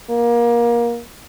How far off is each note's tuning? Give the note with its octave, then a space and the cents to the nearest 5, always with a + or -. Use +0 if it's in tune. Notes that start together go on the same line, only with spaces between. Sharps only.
A#3 +25